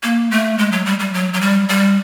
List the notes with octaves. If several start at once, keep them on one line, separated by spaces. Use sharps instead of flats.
A#3
A3
G#3
F#3
G3
G3
F#3
F#3
G3
G3